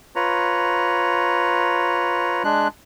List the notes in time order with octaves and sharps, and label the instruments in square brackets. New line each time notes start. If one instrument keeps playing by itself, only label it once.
[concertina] F4 B4 C#5 A#5
G#3 D4 F#6